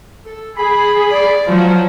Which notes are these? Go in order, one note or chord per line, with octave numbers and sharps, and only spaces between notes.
A4
G#4 B5
D5
F3 F#3